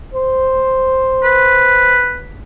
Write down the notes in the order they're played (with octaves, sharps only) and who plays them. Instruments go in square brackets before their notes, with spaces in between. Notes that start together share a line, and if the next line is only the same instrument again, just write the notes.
[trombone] C5
[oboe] B4